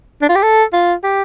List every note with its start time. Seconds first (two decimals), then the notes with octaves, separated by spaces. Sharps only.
0.21 D4
0.29 F4
0.35 G4
0.43 A4
0.73 F4
1.03 G4